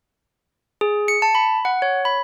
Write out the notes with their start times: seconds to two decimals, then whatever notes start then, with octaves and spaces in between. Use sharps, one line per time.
0.81 G#4
1.08 C#7
1.22 A5
1.35 B5
1.65 F#5
1.82 C#5
2.05 B5